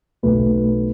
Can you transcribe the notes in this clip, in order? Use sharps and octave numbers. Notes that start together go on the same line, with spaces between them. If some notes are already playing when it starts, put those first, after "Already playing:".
B1 B2 A3 B4